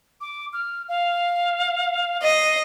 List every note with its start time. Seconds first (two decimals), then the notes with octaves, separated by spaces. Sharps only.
0.21 D6
0.53 F6
0.89 F5
2.23 D#5 C7